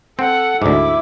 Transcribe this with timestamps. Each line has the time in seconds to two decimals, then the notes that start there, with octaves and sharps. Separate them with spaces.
0.19 C4 A4 F#5
0.62 D2 G#2 E4 D6